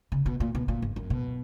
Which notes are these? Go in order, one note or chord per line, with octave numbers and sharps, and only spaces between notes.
C#3
B2
A#2
B2
A#2
G#2
F#2
B2